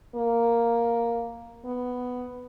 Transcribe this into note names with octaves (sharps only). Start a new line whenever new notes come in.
A#3
B3